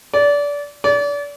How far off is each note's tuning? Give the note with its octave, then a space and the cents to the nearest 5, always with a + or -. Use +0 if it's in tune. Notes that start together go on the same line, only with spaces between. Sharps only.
D5 -25
D5 -35